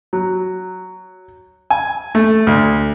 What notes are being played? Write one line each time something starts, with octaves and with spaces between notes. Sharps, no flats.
F#3
G#5
A3
D2